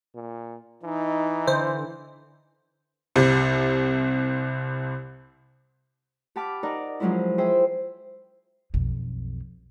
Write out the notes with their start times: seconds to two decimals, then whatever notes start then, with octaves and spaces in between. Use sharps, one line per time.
0.15 A#2
0.83 E3 D#4
1.47 D3 C5
3.16 C2 C3
6.36 G4 F#5 A5 B5 D6 F6
6.63 D#4 A#4 D5 F#5
7.00 F3 F#3 G#3 C#4 E4
7.38 G#4 C5 E5 G5
8.74 B1 F2